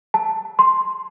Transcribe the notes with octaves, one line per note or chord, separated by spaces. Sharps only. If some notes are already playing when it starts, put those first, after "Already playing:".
A5
C6